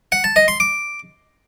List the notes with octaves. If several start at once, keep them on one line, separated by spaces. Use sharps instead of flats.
F#5
A5
D#5
C6
D6